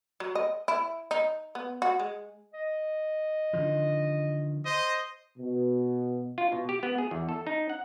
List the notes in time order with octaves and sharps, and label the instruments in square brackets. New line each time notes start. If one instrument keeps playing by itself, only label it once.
[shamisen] F#3
D#5
E4
D#4
B3
F#4
G#3
[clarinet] D#5
[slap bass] D3 D#3 F3
[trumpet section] C5 D#5
[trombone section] B2
[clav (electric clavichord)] F4
B2
G4
B3
G#4
E2
A4
D#4
F#5